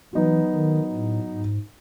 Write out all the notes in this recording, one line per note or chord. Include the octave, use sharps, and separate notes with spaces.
E3 F#3 B3 D#4 F#4
D#3
A2
G#2